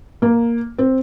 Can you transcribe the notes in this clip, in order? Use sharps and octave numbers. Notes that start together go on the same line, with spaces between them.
A#3
C4